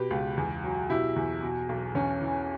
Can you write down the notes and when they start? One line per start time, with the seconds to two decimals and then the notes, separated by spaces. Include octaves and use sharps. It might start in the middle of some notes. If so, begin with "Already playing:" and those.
Already playing: B2 G4 B4
0.10 C#2
0.37 E2
0.64 F#3
0.89 B2 E4 G4
1.16 E2
1.43 B2
1.69 B1
1.95 E2 C#4
2.21 E3